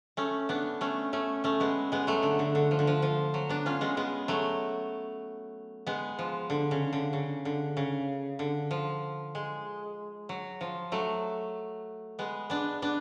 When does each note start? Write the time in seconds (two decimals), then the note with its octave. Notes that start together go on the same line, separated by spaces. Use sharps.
0.17 A3 C#4
0.49 B3 D4
0.81 A3 C#4
1.13 A3 C#4
1.44 A3 C#4
1.60 G#3 B3
1.92 G#3 B3
2.07 F#3 A3
2.23 D3
2.39 D3
2.55 D3
2.71 F3
2.79 D3
2.87 F3
3.02 F3
3.34 F#3
3.49 B3 D4
3.66 C#4 F4
3.81 G#3 B3
3.97 G#3 B3
4.28 F#3 A3
5.87 G#3 B3
6.19 F3
6.50 D3
6.71 C#3
6.93 D3
7.13 C#3
7.45 D3
7.77 C#3
8.39 D3
8.71 F3
9.35 G#3
10.29 F#3
10.61 F3
10.92 F#3 A3
12.19 G#3 B3
12.50 B3 D4
12.82 B3 D4